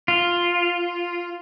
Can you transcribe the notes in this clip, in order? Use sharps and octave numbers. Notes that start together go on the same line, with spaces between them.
F4